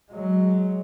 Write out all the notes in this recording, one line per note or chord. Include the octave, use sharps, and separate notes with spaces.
F#3 G#3